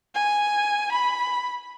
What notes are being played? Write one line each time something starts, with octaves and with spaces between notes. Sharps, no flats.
G#5
B5